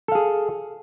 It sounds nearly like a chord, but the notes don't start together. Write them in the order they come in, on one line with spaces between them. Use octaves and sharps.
A4 F5 G#4